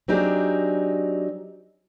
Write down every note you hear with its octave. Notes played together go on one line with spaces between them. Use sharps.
F#3 C4 D4 D#4 G4 G#4